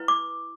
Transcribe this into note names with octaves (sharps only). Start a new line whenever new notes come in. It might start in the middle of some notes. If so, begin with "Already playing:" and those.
Already playing: E4 B4
D6